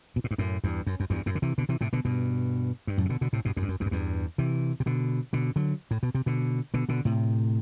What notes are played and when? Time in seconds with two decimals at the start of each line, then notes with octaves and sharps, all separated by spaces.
0.16 B2
0.24 A2
0.31 G2
0.38 F#2 A2
0.64 E2 G2
0.87 F#2
1.00 F#2
1.10 E2 G2
1.26 F#2 A2
1.35 D3
1.42 C3 E3
1.58 B2 D3
1.69 C3 E3
1.81 A2 C3
1.93 B2 D3
2.05 G2 B2
2.87 G2
2.98 F#2 A2
3.05 C3
3.09 B2 D3
3.21 B2 D3
3.33 A2 C3
3.45 G2 B2
3.57 F#2 A2
3.62 G2
3.69 F#2
3.80 E2 G2
3.86 F#2
3.91 E2 G2
4.38 C3 E3
4.80 C3
4.86 B2 D3
5.33 B2 D3
5.56 D3 F#3
5.91 A2
6.03 B2
6.15 C3
6.26 B2 D3
6.74 B2 D3
6.89 B2 D3
7.05 A2 C3